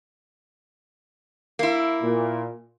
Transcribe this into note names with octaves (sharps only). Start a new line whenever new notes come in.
A#3 E4
A#2